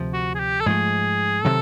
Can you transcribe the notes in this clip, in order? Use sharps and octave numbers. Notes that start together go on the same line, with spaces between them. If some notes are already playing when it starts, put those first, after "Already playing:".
Already playing: D2 C3 F3
F#4
G#4
G4
A4
G#2 F3 A3 G#4
C3 D#3 F#3 A4